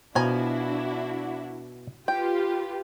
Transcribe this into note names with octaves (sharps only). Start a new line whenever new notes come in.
B2 F3 D4 E4 F#4 G#5 A#5
F4 G4 B4 G5